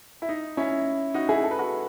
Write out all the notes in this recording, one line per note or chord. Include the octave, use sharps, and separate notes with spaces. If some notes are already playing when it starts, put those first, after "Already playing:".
E4
D#4
C#4 E4
D#4 F#4
E4 G#4
A4
B4
F#4 A4